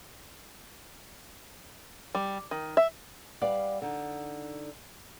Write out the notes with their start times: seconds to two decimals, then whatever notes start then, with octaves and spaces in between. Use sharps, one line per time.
2.15 G3
2.51 D#3
2.77 E5
3.41 G3 B4 D5 F5 F#5
3.82 D3 D#4